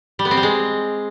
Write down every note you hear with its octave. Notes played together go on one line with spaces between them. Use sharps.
G3
B3
C4
G3
G#3